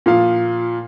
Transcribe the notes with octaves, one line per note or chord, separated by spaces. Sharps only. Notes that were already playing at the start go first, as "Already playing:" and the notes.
A#2 F3 F5